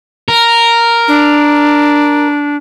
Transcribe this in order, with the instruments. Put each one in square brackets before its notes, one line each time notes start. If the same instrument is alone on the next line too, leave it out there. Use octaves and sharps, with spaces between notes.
[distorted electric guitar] A#4
[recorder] D4